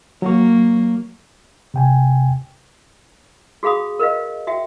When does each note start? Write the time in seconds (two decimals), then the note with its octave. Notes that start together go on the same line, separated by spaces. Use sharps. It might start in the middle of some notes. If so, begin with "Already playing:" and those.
0.22 F#3 A#3 C#6
1.74 C3 G5 G#5
3.63 F#4 G#4 F5 B5 D#6
3.99 A#4 B4 D#5 F5
4.47 F#4 E5 G5